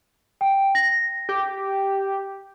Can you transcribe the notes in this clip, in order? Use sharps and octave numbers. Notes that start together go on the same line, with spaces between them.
G5
A#6
G4